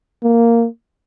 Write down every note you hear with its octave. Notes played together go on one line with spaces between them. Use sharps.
A#3